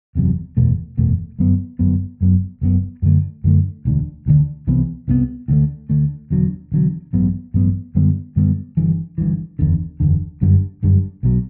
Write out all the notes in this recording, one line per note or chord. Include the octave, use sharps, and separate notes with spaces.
F#1 E2 C3 F#3
F#1 E2 B2 A3
F#1 E2 B2 A3
G1 F#2 F#3 B3
G1 F#2 F#3 B3
F#1 F#2 F#3 B3
F#1 F#2 F#3 B3
F#2 D3 A3
F#2 D3 A3
E1 D2 D3
E1 D2 D3
C2 C3 E3 B3
C2 C3 E3 B3
D2 D3 A3
D2 D3 A3
E1 E2 D3 F#3
E1 E2 D3 F#3
A1 G2 F#3 B3
A1 G2 F#3 B3
F#2 D3 G3 B3
F#2 D3 G3 B3
G1 G2 E3
G1 G2 E3
F#1 E2 D3
F#1 E2 D3
G1 F#2 D3 G3
G1 F#2 D3 G3
B1 B2 F#3